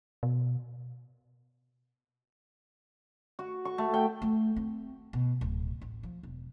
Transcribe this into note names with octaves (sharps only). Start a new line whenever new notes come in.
B2
F#4
C#6
A3
G5
A3
C4
B2
D1
A1
F3
E1